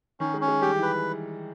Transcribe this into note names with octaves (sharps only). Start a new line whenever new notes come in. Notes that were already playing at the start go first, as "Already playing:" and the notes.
D#3 C#4
G#3
C#4
G#3
G3 G4
E3
B4